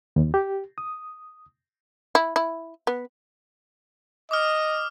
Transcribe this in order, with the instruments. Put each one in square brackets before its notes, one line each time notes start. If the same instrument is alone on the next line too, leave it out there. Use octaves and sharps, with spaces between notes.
[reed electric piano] D#2
G4
D#6
[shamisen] E4
E4
B3
[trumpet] D#5 [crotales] D6 D#6 F6